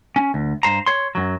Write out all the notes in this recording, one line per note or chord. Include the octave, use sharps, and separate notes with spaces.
C#4
D2
G2 C5 A#5
C#5 C6
F#2 F#3